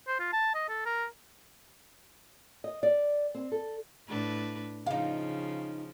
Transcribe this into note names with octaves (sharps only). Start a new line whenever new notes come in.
C5
F4
A5
D#5
A4
A#4
D#5
D5
C4
A4
A2 D4 B4
C#3 F3 D#4 F5